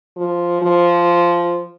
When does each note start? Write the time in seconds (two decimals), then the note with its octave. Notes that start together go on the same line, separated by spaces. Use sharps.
0.17 F3
0.62 F3